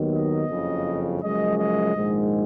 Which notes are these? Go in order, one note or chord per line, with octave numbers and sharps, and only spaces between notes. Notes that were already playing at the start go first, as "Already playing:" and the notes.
Already playing: D#2 D#3 F#3 B3
D#5
F#1 F2 C#3
F#1 F#2 F3 G#3 C#4 D#5
D#5
A#1 G#2 D#3 G#3